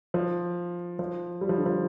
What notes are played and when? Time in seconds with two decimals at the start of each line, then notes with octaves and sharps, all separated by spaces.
0.14 F3
0.99 F3
1.41 G3
1.49 F3
1.58 D3
1.66 F3